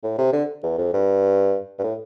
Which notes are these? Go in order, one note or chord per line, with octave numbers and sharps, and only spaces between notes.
A2
C3
D3
E2
F2
G2
G2
A2